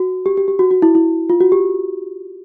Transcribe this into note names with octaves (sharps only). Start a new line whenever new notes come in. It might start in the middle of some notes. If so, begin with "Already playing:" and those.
Already playing: F#4
G4
G4
G4
F#4
F#4
E4
E4
F4
F#4
G4